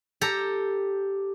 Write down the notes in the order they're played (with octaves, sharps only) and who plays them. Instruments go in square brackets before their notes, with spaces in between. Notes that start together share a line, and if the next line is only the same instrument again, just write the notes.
[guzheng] G4 A4 A#5